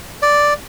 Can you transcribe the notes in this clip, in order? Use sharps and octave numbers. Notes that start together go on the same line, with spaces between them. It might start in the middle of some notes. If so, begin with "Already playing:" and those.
D5